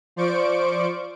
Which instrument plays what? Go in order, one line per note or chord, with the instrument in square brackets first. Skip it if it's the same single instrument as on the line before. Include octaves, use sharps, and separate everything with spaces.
[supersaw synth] F3 C5 D5 C#6 D7